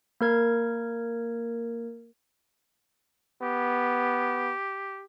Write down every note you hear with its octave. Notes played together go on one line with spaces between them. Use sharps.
A#3 A#4 G#6
B3 G4